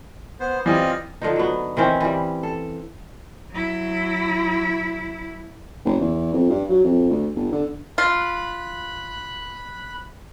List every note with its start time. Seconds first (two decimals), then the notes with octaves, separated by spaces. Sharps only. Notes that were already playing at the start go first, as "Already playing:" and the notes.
0.40 B3 C5
0.66 E3 G3 C4 F4 D#5
1.22 D3 F3 D#4
1.36 F#3 B3
1.77 D#3 E3 C4 C#4
2.00 E3 G3
2.43 A4
3.51 F#3 E4
5.85 F#1
6.00 E2
6.34 F2
6.50 G2
6.70 F#3
6.84 F2
7.10 D2
7.36 G1
7.52 D3
7.98 F4 B5 F#6